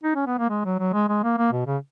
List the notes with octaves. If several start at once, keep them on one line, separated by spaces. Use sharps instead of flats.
D#4
C#4
B3
A#3
G#3
F#3
F#3
G#3
G#3
A#3
A#3
B2
C#3